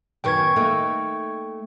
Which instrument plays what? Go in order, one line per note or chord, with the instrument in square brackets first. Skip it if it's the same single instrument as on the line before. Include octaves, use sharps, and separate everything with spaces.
[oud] F#2 D#3 B3 [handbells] G5 C#6 G#6
[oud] A3 A#3 D#4